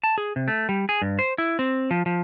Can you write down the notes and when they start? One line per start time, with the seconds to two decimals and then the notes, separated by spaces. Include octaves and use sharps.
0.04 A5
0.18 G#4
0.36 C3
0.48 A3
0.69 G3
0.89 G#4
1.02 G2
1.19 C5
1.38 E4
1.59 C4
1.91 F3
2.06 F3